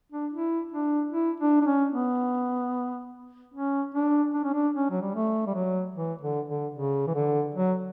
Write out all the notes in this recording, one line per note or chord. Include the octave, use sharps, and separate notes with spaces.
D4
E4
D4
E4
D4
D4
C#4
B3
C#4
D4
D4
C#4
D4
C#4
F#3
G3
A3
G3
F#3
E3
D3
D3
C#3
E3
D3
F#3